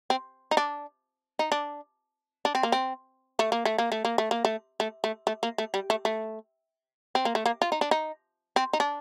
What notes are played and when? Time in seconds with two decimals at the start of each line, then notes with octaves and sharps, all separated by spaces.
0.10 C4
0.51 D#4
0.57 D4
1.39 D#4
1.52 D4
2.45 D4
2.55 C4
2.63 A#3
2.72 C4
3.39 A3
3.52 A#3
3.65 A3
3.78 A#3
3.92 A3
4.05 A#3
4.18 A3
4.31 A#3
4.45 A3
4.80 A3
5.04 A3
5.27 A3
5.43 A#3
5.58 A3
5.74 G3
5.90 A3
6.05 A3
7.15 C4
7.25 A#3
7.35 A3
7.46 A#3
7.62 F4
7.72 D#4
7.81 D4
7.91 D#4
8.56 C4
8.73 D#4
8.80 D4